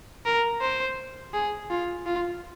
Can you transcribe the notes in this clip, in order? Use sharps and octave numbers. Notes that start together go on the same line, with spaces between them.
A#4
C5
G#4
F4
F4